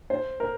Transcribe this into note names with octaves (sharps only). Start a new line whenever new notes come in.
C5
A#4